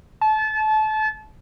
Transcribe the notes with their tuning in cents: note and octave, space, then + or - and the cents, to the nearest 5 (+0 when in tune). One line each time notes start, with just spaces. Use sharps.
A5 -30